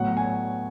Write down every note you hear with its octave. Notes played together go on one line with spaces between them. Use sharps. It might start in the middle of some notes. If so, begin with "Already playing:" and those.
Already playing: A2 F#3 B3 F#5
G#5